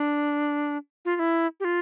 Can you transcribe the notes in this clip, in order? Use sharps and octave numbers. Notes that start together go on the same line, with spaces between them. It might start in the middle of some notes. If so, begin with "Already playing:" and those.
Already playing: D4
F4
F4
E4
G4
F4